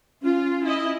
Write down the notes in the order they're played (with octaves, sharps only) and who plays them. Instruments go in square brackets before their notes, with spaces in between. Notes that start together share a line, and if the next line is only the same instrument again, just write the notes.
[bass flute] C#4 [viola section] F4
[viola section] E4 D#5